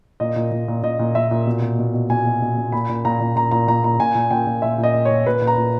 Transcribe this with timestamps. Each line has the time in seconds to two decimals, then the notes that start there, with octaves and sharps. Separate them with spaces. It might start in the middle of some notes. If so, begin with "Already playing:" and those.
0.20 A#2 D#5
0.36 A#2
0.52 A#2
0.68 A#2
0.83 A#2 D#5
0.99 A#2
1.15 A#2 E5
1.31 A#2
1.47 B2
1.62 B2
1.79 B2
1.94 B2
2.10 B2 G#5
2.26 B2
2.42 B2
2.58 B2
2.72 A#2 B5
2.89 A#2
3.05 A#2 A#5
3.20 A#2
3.36 A#2 A#5
3.51 A#2 A#5
3.68 A#2 A#5
3.84 A#2 A#5
4.00 A#2 G#5
4.15 A#2
4.31 A#2 G5
4.47 A#2
4.62 A#2 E5
4.78 A#2
4.84 D#5
4.94 A#2
5.05 C#5
5.11 A#2
5.26 A#2 B4
5.41 A#2
5.47 A#5
5.57 A#2